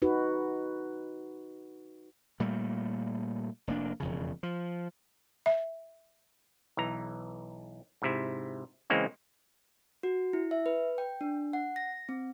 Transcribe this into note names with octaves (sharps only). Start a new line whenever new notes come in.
D#4 F#4 B4
A#2 G3 A3 A#3
F1 A#3 D4
E1 F2 C#3
F3
E5
B1 E3 A#5
G#2 C3 E4
C#3 E3 G#3 A#3 C4 C#4
F#4
E4
E5
B4
G5
D4
F#5
A#6
C4